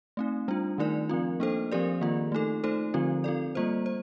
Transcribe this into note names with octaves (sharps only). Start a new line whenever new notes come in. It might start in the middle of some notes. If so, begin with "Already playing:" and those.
A3 C4 D#4
G3 D4 F4
D#3 A3 D#4 A#4 D5
F3 C4 F4
A#3 D4 A4 C5
F3 C4 G4 A#4 D5
D#3 A#3 F4
A3 D#4 A4
A3 D#4 A4 C5
D3 F3 C4 F4
C4 F4 A4 D5
G3 A#3 F4 C5
C5